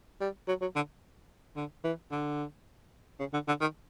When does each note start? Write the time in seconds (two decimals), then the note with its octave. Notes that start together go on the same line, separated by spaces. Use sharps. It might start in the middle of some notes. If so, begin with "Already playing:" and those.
0.21 G3
0.48 F#3
0.61 F#3
0.75 D3
1.56 D3
1.84 E3
2.11 D3
3.20 C#3
3.33 D3
3.48 D3
3.61 D#3